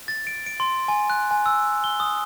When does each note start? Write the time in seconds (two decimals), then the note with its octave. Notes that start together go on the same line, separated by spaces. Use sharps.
0.08 A6
0.27 D7
0.47 D7
0.60 C6
0.88 G#5
1.10 F#6
1.31 G#5
1.46 E6
1.84 G7
2.00 D#6